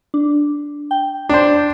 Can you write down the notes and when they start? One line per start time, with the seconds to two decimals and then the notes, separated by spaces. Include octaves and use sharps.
0.14 D4
0.91 G5
1.29 D4 C5